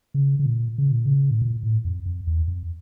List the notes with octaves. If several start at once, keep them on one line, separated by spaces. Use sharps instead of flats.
C#3
C#3
A#2
C#3
A#2
C#3
A2
A#2
A2
F2
F2
E2
F2